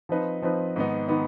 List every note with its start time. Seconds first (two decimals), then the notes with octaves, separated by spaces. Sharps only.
0.09 F3 C4 D#4 B4
0.42 F3 C4 D#4 B4
0.76 G#2 D#3 B3 D#4
1.08 D#3 B3 D#4